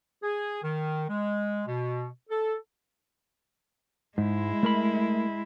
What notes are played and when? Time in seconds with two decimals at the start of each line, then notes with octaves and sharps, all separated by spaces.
0.23 G#4
0.63 D#3
1.09 G#3
1.67 B2
2.30 A4
4.18 G#2 G#3 E4
4.63 A3 A#4 B5